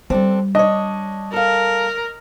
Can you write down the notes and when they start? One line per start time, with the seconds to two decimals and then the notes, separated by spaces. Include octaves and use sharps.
0.10 G3 C4 D4 A4
0.55 D4 C#5 D#5
1.33 A4 A#4 F5